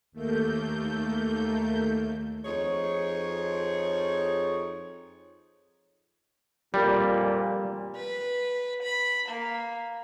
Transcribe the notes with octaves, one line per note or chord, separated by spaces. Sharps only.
D#2 A3 A#3 G6
F2 D#4 G#4 C#5
F2 A#2 G3
B4
B5
A#3